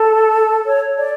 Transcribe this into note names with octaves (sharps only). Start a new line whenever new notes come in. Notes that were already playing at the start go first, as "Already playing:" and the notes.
Already playing: A4
C#5
D5